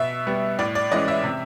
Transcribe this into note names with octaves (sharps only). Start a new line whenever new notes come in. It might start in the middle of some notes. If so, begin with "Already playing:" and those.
Already playing: B2 E5
G3 B3
A2 D5
D5
E3 G#3 C#4 D#5
E5
C3